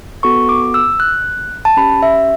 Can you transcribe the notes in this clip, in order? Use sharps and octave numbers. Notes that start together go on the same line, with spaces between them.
B3 F#4 A4 C#6
D6
E6
F#6
A5
C#4 G4 B5
E5